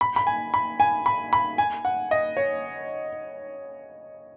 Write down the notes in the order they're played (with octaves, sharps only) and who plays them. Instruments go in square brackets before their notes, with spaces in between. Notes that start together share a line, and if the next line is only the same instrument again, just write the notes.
[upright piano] B5
B5
G#5
B5
G#5
B5
B5
G#5
F#5
D#5
C#5